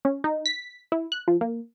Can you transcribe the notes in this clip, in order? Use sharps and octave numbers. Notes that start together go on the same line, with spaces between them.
C#4
D#4
B6
E4
F#6
F3
A#3